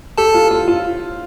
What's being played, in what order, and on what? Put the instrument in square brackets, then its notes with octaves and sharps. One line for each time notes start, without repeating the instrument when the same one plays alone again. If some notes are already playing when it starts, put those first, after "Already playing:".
[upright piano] G4 [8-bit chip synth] A4 A5
[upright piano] F4
F4
F4